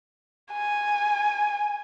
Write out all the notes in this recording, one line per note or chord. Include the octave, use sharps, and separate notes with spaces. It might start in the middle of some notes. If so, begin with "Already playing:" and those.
G#5